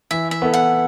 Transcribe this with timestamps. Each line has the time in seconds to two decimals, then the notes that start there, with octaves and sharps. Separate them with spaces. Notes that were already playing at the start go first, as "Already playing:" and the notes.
0.11 E3 E5
0.31 E5
0.42 B3 E4 A4
0.54 F#5